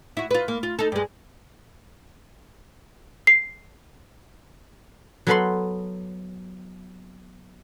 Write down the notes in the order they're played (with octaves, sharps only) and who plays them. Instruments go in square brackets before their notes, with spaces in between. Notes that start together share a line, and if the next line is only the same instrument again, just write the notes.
[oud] E4 F#4
F4 B4
A#3
F4
D#4 A4
G2 G#3
[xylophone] C7
[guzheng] F#3 B3 A4 B4 B5 C6